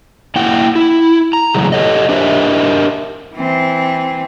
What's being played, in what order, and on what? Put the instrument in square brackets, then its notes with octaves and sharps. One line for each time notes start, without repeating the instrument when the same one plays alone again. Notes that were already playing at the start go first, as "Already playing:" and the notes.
[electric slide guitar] A#3 E4 F#5 G5
E4
A#5
E2 A2 C#3 F#3 G#3
G4 A4 C#5 D#5
D4 G4 A#4 C5 D#5 E5
[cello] E3 C4